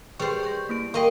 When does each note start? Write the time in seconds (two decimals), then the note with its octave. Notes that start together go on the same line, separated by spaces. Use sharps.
0.20 G3 G#4 B4 C5 C#6
0.43 C#6 G6 A#6
0.69 A#3 E4 D7
0.94 A#3 D#5 G5 C6 C#6